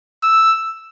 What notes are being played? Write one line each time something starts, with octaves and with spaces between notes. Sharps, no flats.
E6